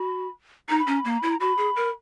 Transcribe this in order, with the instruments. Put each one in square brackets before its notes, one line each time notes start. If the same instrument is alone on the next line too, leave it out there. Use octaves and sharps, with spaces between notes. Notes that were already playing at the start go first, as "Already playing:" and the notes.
Already playing: [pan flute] F#4 [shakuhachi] B5
[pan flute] D#4 [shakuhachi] A#5
[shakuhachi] B5
[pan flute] C#4 [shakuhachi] A#5
[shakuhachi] B5
[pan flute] A#3 [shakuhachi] A#5
[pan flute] E4 [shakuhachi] B5
[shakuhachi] A#5
[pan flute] F#4 [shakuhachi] B5
[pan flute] G#4
A#4